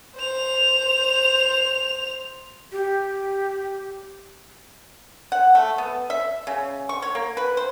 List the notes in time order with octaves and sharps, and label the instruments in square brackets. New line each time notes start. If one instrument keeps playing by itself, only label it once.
[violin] C5 F7
[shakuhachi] G4
[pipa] F#5
A3
B3
E5
C#3
C#6
C#5
A#3
B4
C5